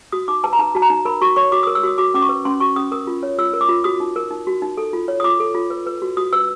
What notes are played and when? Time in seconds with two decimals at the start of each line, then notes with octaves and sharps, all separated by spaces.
0.12 F#4 D#6
0.28 D#4 D6
0.44 B4 A5
0.53 A#5
0.59 D#4 A5
0.75 F#4 A5
0.82 A#5
0.90 D#4
1.05 A#4 B5
1.21 F#4 C#6
1.36 C#5 C#6
1.52 F#4 D6
1.63 A#4 D#6
1.75 E6
1.83 F#4 D#6
1.98 F#4 D6
2.14 C#4 D6
2.22 C#6
2.29 B4
2.45 C#4 C6
2.60 F#4 C#6
2.76 C#4 D#6
2.92 A#4 D#6
3.07 F4
3.23 C#5
3.38 F4 E6
3.53 A#4
3.61 D6
3.69 F4
3.84 F#4 D#6
4.00 D#4
4.16 A#4
4.31 D#4
4.47 F#4
4.62 D#4
4.77 A4
4.93 F4
5.08 C#5
5.20 D#6
5.24 F4 D6
5.40 A4
5.55 F4
5.70 B4
5.86 B4
6.02 F#4
6.17 F#4 D#6
6.33 B4 E6